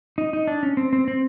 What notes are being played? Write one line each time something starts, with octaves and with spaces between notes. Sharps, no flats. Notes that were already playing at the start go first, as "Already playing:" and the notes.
D#4
D#4
D4
C#4
C4
C4
C4